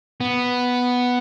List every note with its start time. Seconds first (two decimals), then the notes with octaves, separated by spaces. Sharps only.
0.21 B3